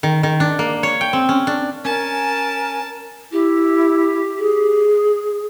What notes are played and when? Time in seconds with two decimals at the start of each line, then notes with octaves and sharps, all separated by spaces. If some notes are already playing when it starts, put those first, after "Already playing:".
0.03 D#3
0.23 D#3
0.40 D4
0.59 A#3
0.83 C#5
1.01 G5
1.13 C4
1.29 C#4
1.47 D4
1.85 C#4 A#4 G#5 A5
3.32 E4 G4
4.39 G#4